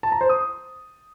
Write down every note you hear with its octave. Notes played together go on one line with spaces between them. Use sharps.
A5
A#5
C5
D#6